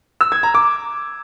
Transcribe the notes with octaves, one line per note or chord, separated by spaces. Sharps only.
E6
G#6
A#5
D6